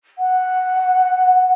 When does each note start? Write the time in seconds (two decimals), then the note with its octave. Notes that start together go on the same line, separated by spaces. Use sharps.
0.19 F#5